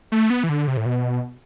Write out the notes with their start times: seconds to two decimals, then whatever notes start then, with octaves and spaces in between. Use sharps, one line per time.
0.12 A3
0.30 B3
0.44 E3
0.49 D3
0.67 C3
0.77 A2
0.86 B2